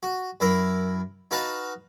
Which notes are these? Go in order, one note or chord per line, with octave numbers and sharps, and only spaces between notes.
F#4
F#2 E4 A#4 B5
D#4 F#4 B4 F5 F#5 A5